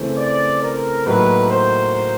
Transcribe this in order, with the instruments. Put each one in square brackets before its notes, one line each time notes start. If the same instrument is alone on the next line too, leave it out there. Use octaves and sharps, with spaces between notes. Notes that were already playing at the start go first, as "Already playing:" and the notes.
Already playing: [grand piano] C#3 E3 A3 C4
[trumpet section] D5
A#4
[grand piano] A2 F#3 A#3 D#4 [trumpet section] B4
[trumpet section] C5